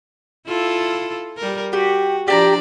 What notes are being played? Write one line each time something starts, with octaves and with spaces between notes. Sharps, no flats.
E4 F4 A4
G3 A#4
F#4 G4
F3 D4 G4 D5 A5 A#5